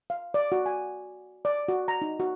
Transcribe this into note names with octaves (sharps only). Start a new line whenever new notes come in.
F5
D5
F#4
G#5
D5
F#4
A#5
D#4
F#4